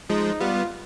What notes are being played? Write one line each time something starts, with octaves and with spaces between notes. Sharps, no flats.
F3 G#3 D#4
G3 B3 F4